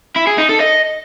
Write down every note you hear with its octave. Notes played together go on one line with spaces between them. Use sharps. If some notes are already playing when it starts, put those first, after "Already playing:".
E4
G#4
D#4
A4
D#5